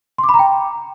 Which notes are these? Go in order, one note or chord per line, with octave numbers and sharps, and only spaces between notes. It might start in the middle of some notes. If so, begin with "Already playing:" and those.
C6
D6
B5
A#5
G5